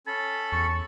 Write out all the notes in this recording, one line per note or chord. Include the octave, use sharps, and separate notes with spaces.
C#4 A4 A5 B5
E2 C#6